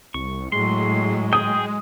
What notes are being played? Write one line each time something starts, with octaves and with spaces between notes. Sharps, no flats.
C2 C#6
A2 F#3 G#3 C6
G#4 G5 D#6